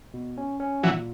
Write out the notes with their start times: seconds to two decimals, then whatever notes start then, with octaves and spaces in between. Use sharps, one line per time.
0.14 B2
0.38 C#4
0.60 C#4
0.83 A#2 E3 F#3